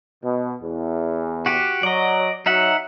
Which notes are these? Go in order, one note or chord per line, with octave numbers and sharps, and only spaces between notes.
B2
E2
F#4 G4
F#3 D5 D#5
F#3 D#4 E5 F#5